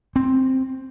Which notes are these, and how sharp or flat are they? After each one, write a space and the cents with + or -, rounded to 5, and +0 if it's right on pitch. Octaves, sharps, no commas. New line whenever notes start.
C4 +5